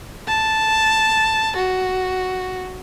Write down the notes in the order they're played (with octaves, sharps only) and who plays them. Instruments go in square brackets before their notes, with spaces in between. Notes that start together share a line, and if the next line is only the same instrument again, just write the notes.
[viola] A5
F#4